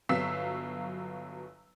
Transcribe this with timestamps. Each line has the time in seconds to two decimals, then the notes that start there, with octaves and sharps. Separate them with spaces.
0.09 G1 F#3 B3 F5 E6 B6